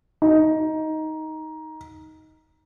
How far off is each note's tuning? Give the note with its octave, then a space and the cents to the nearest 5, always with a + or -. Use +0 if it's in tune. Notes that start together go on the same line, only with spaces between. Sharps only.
D#4 +10